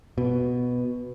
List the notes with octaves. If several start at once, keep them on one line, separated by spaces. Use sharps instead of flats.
B2